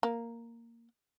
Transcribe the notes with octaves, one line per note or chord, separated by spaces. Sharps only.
A#3